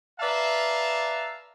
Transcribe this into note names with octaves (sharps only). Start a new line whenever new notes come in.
B4 D5 E5 F5 A5 A#5